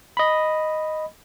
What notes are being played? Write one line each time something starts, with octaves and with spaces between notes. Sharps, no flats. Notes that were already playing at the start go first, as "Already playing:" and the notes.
D#5 B5